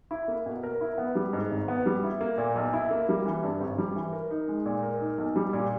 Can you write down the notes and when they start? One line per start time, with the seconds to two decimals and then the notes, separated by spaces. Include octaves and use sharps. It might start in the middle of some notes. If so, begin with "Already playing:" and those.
0.11 E4
0.28 A#3
0.46 B2
0.63 A#4
0.81 E4
0.98 B3
1.15 G3
1.33 G#2
1.51 G#1
1.68 B3
1.86 G3
2.04 E4
2.21 A#3
2.38 A#2
2.56 B1
2.74 E4
2.91 A#3
3.09 G3
3.25 E3
3.43 G2
3.61 G#1
3.78 G3
3.95 E3
4.13 A#4
4.31 D#4
4.48 G#3
4.66 A#2
4.83 A#4
5.00 D#4
5.18 B1
5.36 G3
5.53 A#2